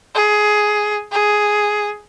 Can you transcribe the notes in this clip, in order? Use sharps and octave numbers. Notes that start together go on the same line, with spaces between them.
G#4
G#4